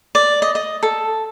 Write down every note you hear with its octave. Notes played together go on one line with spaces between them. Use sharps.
D5
D#5
D#5
A4